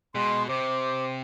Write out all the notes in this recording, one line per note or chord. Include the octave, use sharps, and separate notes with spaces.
B2 G#3 C6
C3 C5 D6